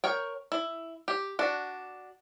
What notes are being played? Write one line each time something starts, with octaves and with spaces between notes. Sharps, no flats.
A#4 C#5 G5
E4
G4
D4 F#4